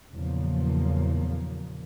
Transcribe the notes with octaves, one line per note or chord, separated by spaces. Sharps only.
E2 A#2 C#3 F3 F#3 A#3